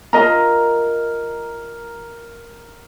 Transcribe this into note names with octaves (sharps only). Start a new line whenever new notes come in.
F4 A#4 D#5 A#5